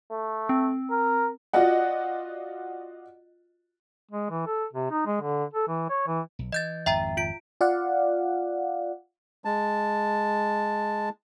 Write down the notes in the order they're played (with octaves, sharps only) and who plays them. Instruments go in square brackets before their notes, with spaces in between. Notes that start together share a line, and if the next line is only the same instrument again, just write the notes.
[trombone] A3
[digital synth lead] C4
[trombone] A#4
[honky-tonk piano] F4 F#4 D5 D#5 F#5
[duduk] G#3
E3
A4
C3
D#4
G#3
D3
A4
E3
C#5
E3
[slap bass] B1
[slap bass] E3 [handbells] D#5 G6 A6
[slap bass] G#1 F2 [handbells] E5 G5 A#5
[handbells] F4 D7
[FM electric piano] F4 D5 F5 F#5
[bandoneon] G#3 A5